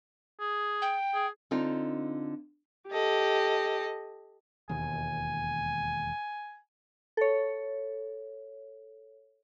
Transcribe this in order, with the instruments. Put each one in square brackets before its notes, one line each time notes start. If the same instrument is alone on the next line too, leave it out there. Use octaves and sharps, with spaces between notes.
[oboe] G#4
[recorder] G5
[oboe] G#4
[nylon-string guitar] D3 C4 D#4 F4
[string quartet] G4 A4 D#5
[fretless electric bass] E1 D#2 [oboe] G#5
[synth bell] A4 C#5